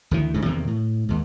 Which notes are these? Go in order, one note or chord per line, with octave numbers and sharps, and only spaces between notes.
D2 D#3 E3
D2 G#2 C#3
E2 C3 D#3 A#3
A2
D#2 G#2